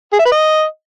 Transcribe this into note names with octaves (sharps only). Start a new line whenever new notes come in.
G#4
E5
B4
D#5